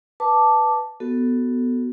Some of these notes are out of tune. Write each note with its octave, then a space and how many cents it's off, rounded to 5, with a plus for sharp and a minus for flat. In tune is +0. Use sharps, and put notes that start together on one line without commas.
B4 +0 A5 +0 D6 +0
B3 +0 F#4 +15 A4 +0